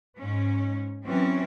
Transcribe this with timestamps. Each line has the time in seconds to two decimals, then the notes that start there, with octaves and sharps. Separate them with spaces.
0.17 G#2 C#4
1.04 E3 F#3 C4 C#4